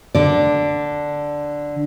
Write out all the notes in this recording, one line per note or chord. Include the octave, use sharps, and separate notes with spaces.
D3 D5